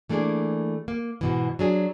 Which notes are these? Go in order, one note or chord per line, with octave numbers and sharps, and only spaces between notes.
E3 A3 A#3 D4 G#4
A#3
G#2 B2 E3
F#3 D4 G#4